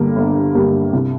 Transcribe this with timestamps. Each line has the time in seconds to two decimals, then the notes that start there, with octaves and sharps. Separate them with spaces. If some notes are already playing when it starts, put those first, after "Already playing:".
Already playing: G2 D3 G3 A#3
0.16 G1
0.55 G2 D3 G3 A#3
0.93 C2